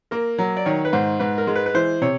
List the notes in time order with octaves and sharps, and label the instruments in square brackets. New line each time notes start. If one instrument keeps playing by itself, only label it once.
[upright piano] A#3 [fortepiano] A#4
[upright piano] F#3
[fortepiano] D5
[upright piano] D#3 [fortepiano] C#5
[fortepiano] B4
[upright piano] G#2 [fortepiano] C5
[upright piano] G#2 [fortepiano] B4
[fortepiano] A#4
[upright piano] G#3
[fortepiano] B4
B4
[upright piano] E3 [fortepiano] C5
[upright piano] C3 [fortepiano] C#5